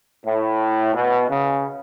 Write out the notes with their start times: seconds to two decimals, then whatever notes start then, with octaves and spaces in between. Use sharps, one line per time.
0.25 A2
0.94 B2
1.28 C#3